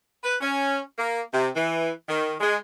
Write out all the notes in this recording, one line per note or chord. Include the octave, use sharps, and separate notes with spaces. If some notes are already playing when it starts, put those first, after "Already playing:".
B4
C#4
A#3
C3
E3
D#3
G#3